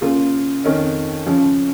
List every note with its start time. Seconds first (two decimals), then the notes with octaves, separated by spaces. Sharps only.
0.01 C#3 A#3 F4 G#4
0.64 F2 D#3 C#4
1.26 C#3 F3 C#4